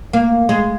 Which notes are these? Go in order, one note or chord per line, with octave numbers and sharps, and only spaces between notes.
A#3
G#3